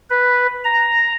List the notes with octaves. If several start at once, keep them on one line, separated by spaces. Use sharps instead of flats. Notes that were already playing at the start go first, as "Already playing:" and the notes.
B4
A#5